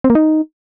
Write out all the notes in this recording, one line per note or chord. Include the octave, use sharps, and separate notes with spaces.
C4
A#3
D#4